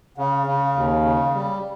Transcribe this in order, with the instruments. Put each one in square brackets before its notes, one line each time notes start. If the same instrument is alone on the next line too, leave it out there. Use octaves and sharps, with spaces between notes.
[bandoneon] C#3 [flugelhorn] F5
[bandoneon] C#3
D#2
C#3
G3